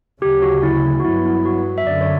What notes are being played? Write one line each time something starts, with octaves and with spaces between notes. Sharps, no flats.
D2 C#3 F#3 G4
F#4
E4
F#4
G2 F#3 B3 E4
E4
F#4
E5
F#2 D3 D5
C#5